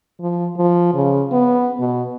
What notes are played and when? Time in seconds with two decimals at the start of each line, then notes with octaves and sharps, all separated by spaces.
0.20 F3
0.57 F3
0.95 C#3
1.32 B3
1.80 B2